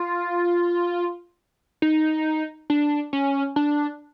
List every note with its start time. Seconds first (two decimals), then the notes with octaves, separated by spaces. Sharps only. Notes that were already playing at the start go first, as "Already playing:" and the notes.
Already playing: F4
1.82 D#4
2.70 D4
3.13 C#4
3.56 D4